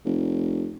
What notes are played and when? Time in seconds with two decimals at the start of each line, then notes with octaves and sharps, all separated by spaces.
0.05 F1